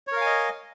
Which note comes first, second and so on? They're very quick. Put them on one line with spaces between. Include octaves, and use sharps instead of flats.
C#5 A#4 F5 G#5 D#5